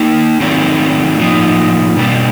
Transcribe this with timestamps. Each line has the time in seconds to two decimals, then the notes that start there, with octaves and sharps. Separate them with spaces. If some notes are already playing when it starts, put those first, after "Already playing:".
Already playing: A#3 D#4 G4
0.41 D#3 F#3 A3 C4 D#4
1.19 A2 F3 A#3 D#4
1.97 B2 G3 A#3 D4